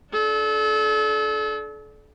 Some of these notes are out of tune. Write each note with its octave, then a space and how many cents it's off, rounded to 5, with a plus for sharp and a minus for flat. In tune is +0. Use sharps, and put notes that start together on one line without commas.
D4 -5 A4 -35